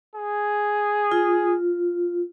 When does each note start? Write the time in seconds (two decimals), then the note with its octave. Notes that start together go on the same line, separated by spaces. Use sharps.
0.15 G#4
1.12 F4